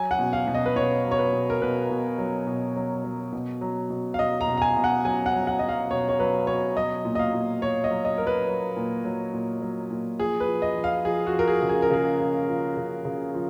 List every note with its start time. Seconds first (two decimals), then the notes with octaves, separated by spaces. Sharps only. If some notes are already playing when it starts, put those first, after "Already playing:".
Already playing: F#3 G#5
0.11 F#5
0.19 B2
0.33 F5
0.47 B2
0.54 D#5
0.66 B4
0.76 B2 C#5
1.05 F#3
1.11 C#5
1.19 B4
1.33 B2
1.50 A#4
1.61 B2 B4
1.90 B2
2.19 F#3
2.47 B2
2.76 F#3
3.04 F#3
3.33 B2
3.61 F#3
3.90 B2
4.14 F5
4.19 F#3 D#5
4.41 A#5
4.47 B2
4.57 A#5
4.62 G#5
4.76 B2
4.84 F#5
5.05 F#3 G#5
5.26 F#5
5.33 F#3
5.47 F#5
5.59 F#3 D#5
5.69 F5
5.91 B2 C#5
6.09 C#5
6.19 F#3 B4
6.47 B2 C#5
6.76 F#3 D#5
7.05 A#2
7.15 D#5
7.19 F5
7.33 A#2
7.62 A#2 C#5
7.84 D#5
7.91 F#3
8.05 D#5
8.18 F#3 A#4
8.27 B4
8.48 F#3
8.77 A#2
9.05 F#3
9.33 A#2
9.62 F#3
9.91 A#2
10.19 F3 G#4
10.40 B4
10.48 F3
10.62 D#5
10.76 F3
10.84 F5
11.05 F3 G#4
11.26 F#4
11.33 F3
11.39 A#4
11.48 G#4
11.62 C#3
11.69 G#4
11.82 A#4
11.90 C#3 G#4
12.20 F3
12.48 F3
12.77 C#3
13.05 C#3
13.34 F3